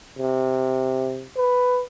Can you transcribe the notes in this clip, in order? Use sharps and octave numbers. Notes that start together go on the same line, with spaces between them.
C3
B4